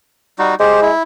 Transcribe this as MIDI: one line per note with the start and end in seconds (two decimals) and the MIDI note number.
0.39 0.55 55
0.39 0.55 63
0.39 0.55 66
0.60 0.90 56
0.60 0.80 67
0.60 0.80 72
0.82 1.03 64